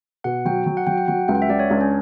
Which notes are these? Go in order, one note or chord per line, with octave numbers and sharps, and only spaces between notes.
B2 F#5
F#3 G5
F#3
F#5
F#3 G5
G5
F#3 F#5
C#2 G5
F#5
E5
C#2 D5
C#5
C#2 D4
C#4